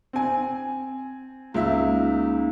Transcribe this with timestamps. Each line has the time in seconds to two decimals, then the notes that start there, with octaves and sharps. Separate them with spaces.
0.13 C4 G#5
1.54 C#2 A#3 C#4 D#4 E5